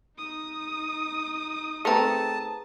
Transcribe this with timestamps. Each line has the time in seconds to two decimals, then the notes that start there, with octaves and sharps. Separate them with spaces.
0.18 D#4 D#6
1.85 A3 C4 G#4 B4 A5 A#5